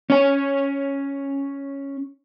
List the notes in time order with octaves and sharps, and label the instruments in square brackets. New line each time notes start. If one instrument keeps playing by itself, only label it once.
[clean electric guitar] C#4 C#5